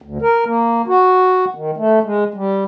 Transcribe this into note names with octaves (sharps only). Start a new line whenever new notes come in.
D2
A#4
A#3
F#4
D#3
A3
G#3
G3